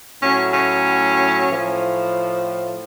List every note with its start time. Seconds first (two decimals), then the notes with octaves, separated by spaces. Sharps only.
0.22 A2 F#3 C#4
0.54 C#4
1.49 A2 F3